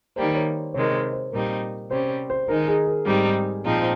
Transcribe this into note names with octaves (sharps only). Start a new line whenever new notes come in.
D#3 G3 A#3 C5
C#5
C3 D#3 G#3 C#5
C5
C5
A#2 G3 C4 D#4 A#4
C3 G3 C#4 C5
C5
D#3 G#3 D#4 A#4
G#4
A#4
G#2 G3 C4 D#4
A#2 F3 C4 D#4 G#4